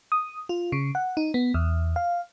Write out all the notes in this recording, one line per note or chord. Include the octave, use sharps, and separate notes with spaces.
D#6
F4
C#3
F#5
D#4
B3
E2
F5